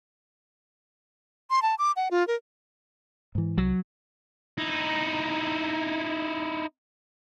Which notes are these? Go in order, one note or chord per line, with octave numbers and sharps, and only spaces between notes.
C6
A5
D6
F#5
F4
A#4
G#2 E3
C2 F#3
D#4 E4